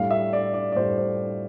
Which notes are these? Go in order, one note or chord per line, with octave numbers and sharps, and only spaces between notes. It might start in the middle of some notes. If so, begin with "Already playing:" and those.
Already playing: A2 G3 D4 F5
E5
D5
D5
D5
A2 G3 D4 C5
C5